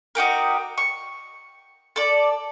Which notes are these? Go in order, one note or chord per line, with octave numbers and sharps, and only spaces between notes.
D#4 F#4 G4 A#4
C#6
A4 D5